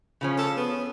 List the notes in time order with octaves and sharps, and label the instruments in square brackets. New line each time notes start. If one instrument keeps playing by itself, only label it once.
[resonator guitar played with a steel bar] C#3 F3 C#4
[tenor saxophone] A4
B3